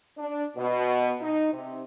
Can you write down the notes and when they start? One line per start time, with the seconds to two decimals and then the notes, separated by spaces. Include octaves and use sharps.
0.18 D4
0.57 B2
1.21 D#4
1.53 C3